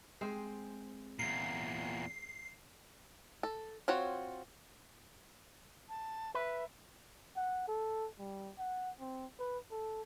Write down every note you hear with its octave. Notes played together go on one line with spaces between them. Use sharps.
G#3 C4 C5
E2 A#2 C7
A4
C4 F4 F#4 C#5
A5
B4 E5
F#5
A4
G3
F#5
C4
B4
A4